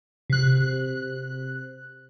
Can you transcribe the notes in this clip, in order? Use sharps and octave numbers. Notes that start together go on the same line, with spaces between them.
C3 F#6